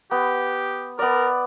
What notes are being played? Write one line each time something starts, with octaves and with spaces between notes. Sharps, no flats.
B3 G4
B3 A#4 D5